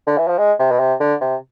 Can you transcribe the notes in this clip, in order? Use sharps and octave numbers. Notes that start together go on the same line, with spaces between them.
D3
E3
F3
G#3
C3
B2
C3
D3
C3